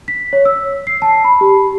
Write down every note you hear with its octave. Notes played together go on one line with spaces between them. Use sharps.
B6
C#5
E6
C7
A5
B5
G4